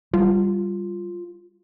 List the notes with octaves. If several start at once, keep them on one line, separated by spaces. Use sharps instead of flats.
G3 F4